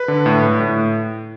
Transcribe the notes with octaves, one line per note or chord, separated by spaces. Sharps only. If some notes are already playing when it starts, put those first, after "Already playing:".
Already playing: B4
D3
A2
A2
A2